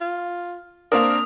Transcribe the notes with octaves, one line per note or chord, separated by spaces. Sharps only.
F4
A#3 C4 D4 A#4 D#6